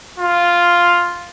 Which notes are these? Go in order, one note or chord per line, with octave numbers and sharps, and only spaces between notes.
F4